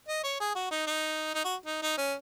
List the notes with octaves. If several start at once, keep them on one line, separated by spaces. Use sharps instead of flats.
D#5
C#5
G#4
F#4
D#4
D#4
D#4
F#4
D#4
D#4
C#4